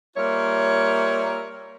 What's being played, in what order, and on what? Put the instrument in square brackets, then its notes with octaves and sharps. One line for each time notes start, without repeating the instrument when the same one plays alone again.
[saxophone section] G3 A#3 F4 A#4 C#5 E5